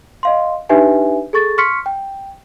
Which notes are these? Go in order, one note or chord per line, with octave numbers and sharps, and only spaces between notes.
D#5 F5 C6
D4 D#4 G4 B4 E5 G#5
G#4 A4 C#6 A6
C6 C#6 F6 B6 C#7
G5